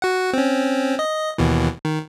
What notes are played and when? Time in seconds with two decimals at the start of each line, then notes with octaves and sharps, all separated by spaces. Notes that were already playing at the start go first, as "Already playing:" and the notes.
0.02 F#4 F#5
0.33 C4 C#4
0.99 D#5
1.38 D#2 B2 E3
1.85 D#3